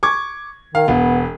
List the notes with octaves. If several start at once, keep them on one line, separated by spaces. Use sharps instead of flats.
C#6 D6 G#6
D#3 F5
E1 B3